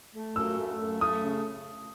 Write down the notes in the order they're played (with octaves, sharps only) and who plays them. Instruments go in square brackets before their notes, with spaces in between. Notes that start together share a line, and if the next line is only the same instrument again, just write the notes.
[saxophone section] A3
[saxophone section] F#2 [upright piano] E6
[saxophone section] A3
F#2
[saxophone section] A3 [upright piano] D#6
[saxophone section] C#3